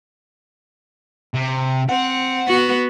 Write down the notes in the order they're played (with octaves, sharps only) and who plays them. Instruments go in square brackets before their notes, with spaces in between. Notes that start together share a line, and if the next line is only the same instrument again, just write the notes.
[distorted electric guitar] C3
[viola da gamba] C4 [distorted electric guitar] F#5
[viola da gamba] B3 F#4